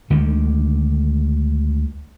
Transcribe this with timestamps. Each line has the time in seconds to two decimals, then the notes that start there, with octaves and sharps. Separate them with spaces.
0.10 D2 D3 D#3 G#3